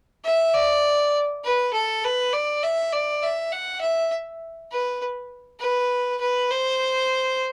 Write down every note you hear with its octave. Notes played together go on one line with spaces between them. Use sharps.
E5
D5
B4
A4
B4
D5
E5
D5
E5
F#5
E5
B4
B4
B4
C5